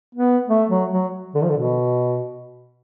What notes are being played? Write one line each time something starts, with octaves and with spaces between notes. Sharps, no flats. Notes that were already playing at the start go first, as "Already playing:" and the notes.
B3
A3
F#3
F#3
D3
F3
D3
B2